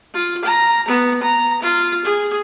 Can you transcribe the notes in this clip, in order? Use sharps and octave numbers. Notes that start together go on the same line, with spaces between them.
F4
A#5
B3
A#5
F4
G#4